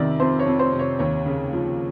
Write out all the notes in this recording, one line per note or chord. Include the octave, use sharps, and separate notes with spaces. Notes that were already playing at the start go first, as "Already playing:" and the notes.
Already playing: F2 C3 D#3 D5 E5
F2 C5
C#5
F2
C5
C3
C#5
D#2 C#5
C#3
F3